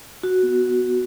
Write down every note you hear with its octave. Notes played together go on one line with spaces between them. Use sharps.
F#4
B3